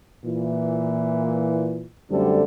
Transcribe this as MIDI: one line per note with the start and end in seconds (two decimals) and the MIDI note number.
0.25 1.84 46
0.25 1.84 52
2.11 2.43 42
2.11 2.43 50
2.11 2.43 55
2.11 2.43 57
2.11 2.43 60
2.11 2.43 69